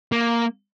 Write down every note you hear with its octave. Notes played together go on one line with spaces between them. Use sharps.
A#3